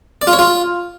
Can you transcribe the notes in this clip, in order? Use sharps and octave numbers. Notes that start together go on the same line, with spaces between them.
D5
F4
C#5
F4